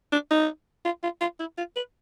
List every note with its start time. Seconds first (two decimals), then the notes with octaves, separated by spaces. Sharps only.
0.12 D4
0.30 D#4
0.85 F4
1.03 F4
1.21 F4
1.39 E4
1.57 F4
1.76 B4